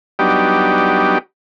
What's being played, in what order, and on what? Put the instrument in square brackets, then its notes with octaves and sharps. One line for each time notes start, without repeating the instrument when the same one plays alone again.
[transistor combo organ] F#3 G3 B3 D4 D#4 G4